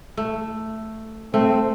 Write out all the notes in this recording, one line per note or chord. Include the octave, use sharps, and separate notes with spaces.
A3
A3 C4